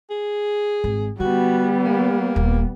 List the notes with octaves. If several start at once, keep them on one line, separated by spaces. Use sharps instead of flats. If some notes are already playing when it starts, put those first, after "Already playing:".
G#4
G#1
D3 G3 B3 F#4
A#3
D#1